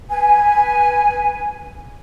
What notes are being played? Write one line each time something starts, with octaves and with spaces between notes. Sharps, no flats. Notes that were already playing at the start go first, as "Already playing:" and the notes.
B4 G#5